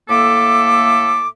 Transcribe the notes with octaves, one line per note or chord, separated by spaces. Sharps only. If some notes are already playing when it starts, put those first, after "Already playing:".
A2 A#3 A4 E5 D6